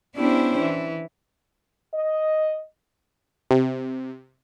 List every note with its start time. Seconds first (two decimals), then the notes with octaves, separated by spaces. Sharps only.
0.15 B3 C#4 D4 E4 G4 C5
0.58 E3
1.93 D#5
3.51 C3